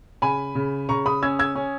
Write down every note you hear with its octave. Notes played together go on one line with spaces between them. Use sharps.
C#3 G#5 B5
C#3
C#3 A#5 C#6
B5 D#6
C#4 E6 G#6
E6 G#6
C#4